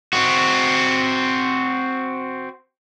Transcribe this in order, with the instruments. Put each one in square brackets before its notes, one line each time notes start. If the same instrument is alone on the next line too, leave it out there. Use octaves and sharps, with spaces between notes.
[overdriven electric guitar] C4 F#4